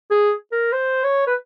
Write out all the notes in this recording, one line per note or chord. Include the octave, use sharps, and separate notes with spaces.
G#4
A#4
C5
C#5
B4